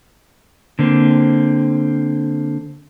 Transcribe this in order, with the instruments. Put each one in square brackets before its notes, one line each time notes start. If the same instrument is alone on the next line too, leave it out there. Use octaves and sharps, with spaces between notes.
[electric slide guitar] D3 A#3 C4